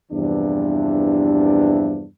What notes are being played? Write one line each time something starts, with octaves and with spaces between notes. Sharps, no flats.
E2 G2 C3 E3 F3 D4